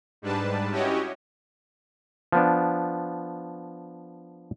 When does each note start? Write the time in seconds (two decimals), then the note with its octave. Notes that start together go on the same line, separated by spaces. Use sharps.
0.22 G#2 G3 D4 B4 A5
0.71 C#4 E4 F#4 G4 C#5 D#5
2.32 F3 B3 D4